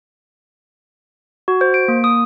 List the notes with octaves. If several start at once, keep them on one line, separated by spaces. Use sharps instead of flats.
F#4
C5
D7
A#3
D#6